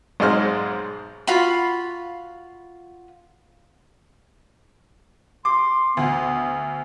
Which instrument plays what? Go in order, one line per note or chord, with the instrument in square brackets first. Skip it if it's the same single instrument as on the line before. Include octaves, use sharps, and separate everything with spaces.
[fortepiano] B1 G#2 G#3 C5 F6
[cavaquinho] F4 F#4 F5 B5
[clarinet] C6 [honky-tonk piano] D6
[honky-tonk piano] D2 [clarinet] B3